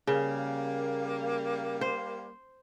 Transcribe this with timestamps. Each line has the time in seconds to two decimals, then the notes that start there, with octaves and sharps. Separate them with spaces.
0.07 C#3 G3 A#3
1.81 C5